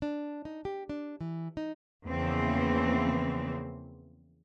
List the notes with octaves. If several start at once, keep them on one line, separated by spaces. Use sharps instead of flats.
D4
D#4
G4
D4
E3
D#4
E2 C#3 E3 F3 A#3 C4